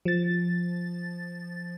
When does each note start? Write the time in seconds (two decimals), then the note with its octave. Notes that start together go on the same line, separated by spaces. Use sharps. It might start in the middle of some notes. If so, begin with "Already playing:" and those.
0.05 F3 A6